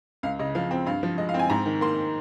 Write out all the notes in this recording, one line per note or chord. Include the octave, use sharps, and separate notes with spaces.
C#2 F5
C#3 D#5
F3 F5
C4
G2 F5
F3
G#3 D#5
F5
C4
G#5
G#2 A#5
D#3
A#3 C6